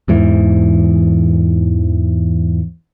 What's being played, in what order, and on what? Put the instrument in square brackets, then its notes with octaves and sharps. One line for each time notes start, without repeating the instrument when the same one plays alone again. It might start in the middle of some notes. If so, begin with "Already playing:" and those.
[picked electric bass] E2 G#2 E3